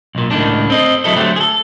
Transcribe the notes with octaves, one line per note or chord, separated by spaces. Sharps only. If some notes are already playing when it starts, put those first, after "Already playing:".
B1 A#2
C#2 A2 D#3 D4
C4 D#5
D2 F#3 E4 A4 D#5
D2 F#3 A3 C4 G4
G#4 A4